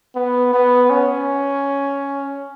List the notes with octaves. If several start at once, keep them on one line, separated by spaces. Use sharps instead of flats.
B3
B3
C#4